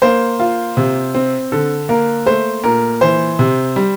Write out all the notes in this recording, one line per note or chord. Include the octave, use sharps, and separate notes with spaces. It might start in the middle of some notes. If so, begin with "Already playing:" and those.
A#3 C5
F4
C3
C4
D3 A4
A#3 A#4
A3 C5
A#2 A#4
E3 C5
C3
G3